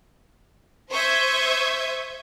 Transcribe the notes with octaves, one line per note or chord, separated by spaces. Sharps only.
C5 E5 C#6 D#6 G6 G#6